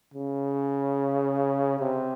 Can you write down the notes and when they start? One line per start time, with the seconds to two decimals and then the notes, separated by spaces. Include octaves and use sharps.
0.14 C#3
1.80 C3